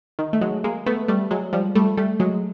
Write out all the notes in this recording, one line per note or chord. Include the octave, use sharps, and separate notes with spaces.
D#3
A3
F#3 G#3
G#3 A#3
A3 B3
G3 A3
F#3 G#3
F3 G3
G3 A3
G3 A3
F#3 G#3